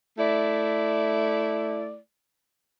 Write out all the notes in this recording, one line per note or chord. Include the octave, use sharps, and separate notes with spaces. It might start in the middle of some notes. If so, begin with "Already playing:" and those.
A3 E4 D5